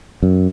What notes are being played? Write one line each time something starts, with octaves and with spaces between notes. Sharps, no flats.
F#2